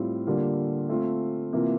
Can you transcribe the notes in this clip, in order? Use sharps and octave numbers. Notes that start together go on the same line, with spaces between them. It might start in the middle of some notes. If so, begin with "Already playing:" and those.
Already playing: A2 G3 C4 F4
D3 G3 A#3 F4
A3 C4 F4
C3 E3 A#3 F4